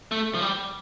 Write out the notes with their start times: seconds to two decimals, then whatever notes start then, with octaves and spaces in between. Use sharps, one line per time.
0.12 A3
0.35 F3
0.42 G3